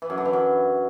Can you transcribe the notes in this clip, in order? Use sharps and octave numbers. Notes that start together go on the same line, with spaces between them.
E3
F#2
D3
E3
F#2